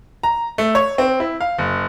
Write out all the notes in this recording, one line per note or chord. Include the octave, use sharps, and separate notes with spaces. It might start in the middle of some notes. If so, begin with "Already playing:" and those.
A#5
A3
C#5
C4
E4
F5
F#1